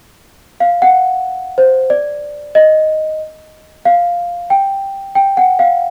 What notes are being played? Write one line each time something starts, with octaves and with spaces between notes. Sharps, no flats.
F5
F#5
C5
D5
D#5
F5
G5
G5
F#5
F5